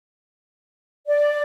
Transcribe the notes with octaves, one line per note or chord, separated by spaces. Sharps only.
D5